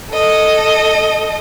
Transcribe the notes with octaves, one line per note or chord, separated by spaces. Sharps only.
A4 D#5